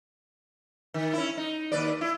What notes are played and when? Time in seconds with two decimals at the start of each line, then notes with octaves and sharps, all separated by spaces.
0.94 D#3
1.13 C#4 E4
1.37 D#4
1.72 D#2 B4 D5
2.01 E4